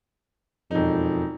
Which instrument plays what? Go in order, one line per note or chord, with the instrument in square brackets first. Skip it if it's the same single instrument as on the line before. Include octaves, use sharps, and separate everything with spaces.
[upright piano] E1 D#4 [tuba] F2